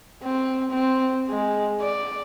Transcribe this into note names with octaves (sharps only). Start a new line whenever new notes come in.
C4
C4
G#3
D5